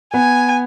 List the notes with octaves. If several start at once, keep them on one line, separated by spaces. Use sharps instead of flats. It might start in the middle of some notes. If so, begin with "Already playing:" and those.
B3 G#5